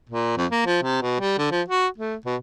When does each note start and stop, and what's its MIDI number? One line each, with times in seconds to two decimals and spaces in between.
0.09 0.33 46
0.37 0.46 41
0.52 0.64 58
0.66 0.78 53
0.83 1.01 48
1.02 1.17 47
1.20 1.37 55
1.38 1.51 50
1.51 1.62 53
1.68 1.87 66
1.98 2.15 57
2.26 2.36 47